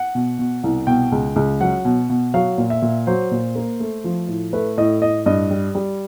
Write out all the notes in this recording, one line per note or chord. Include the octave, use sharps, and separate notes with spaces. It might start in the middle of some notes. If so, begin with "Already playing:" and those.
Already playing: F#5
B2
B2
C2
B2 G5
C#2
C#2
F#3 F#5
B2
B2
F#3 F5
A#2
E5
A#2
F#3 C5
A#2
A#3
A3
F3
A2
A3 B4
A2 D#5
A2 D#5
G2 D#5
G3
G3